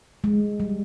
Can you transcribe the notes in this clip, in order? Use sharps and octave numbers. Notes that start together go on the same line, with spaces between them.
G#3
G3